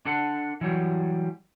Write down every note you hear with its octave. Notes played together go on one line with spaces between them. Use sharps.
D4 A4 F#5
E3 F#3 G3